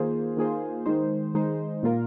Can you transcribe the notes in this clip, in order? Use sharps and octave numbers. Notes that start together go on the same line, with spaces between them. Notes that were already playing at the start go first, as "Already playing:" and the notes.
Already playing: D#3 A#3 F4 G#4 C5
D#3 A#3 F4 G#4 C5
D#3 G#3 D#4 C5
D#3 G#3 D#4 C5
A#2 A#3 F4 A#4